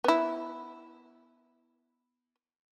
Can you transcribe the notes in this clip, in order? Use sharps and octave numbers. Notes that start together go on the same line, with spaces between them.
B3 E4